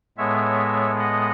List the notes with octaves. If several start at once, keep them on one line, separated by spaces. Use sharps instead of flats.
A2 G#3 B3 C#5 E5
D#5 F#5